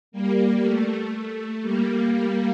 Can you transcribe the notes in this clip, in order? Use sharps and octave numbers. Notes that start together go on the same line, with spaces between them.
G3 A#3
A3
A3
G3 A#3
G3 A#3